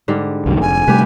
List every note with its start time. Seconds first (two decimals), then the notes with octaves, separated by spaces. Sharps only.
0.08 G#2 D3 G3
0.46 C2 F#2 D#3
0.61 F1 G#5
0.88 C3 G3 A3 G4 B4